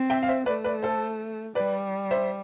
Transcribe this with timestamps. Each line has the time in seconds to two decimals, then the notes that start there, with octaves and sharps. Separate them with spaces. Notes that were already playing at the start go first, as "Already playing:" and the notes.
Already playing: C4
0.10 E5 G5
0.23 F5
0.29 C5 E5
0.46 A3 B4 D5
0.64 B4 D5
0.83 A4 C5
1.55 G3 B4 D5
2.11 C5 E5